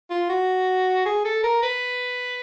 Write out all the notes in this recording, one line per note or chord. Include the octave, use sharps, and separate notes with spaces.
F4
F#4
G#4
A4
A#4
B4